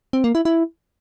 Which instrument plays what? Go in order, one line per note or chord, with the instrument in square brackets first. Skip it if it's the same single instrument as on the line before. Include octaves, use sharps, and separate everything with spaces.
[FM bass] C4
A#3
E4
E4